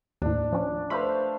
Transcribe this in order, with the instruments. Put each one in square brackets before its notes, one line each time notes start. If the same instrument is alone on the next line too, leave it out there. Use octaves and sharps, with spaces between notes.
[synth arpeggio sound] D#2 A2 [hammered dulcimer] D4
[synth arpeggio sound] F3 C#4
[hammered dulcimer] A3 C5 F5 [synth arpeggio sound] B4 B5